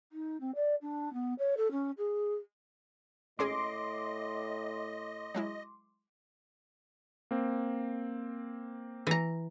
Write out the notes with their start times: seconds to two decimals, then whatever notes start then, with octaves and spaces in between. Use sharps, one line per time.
0.12 D#4
0.40 C4
0.55 D5
0.81 D4
1.13 B3
1.39 C#5
1.57 A4
1.71 C#4
1.98 G#4
3.39 G#1 A2 C#4 G#4 D#5 C6 D6
5.35 F#3 G#3 E4
7.31 A#3 C4
9.07 E3 A#5